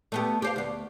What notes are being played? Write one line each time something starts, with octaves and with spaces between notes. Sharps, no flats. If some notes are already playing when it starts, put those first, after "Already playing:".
A3 B3 G4
G4 C5 F5
D2 B3